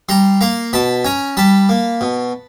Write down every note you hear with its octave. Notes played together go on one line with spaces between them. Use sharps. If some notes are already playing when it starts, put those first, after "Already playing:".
G3 A#5 C6
A#3 A#5 C6
B2 A5 B5
C#4 G#5 A#5
G3 A5 B5
A#3
B2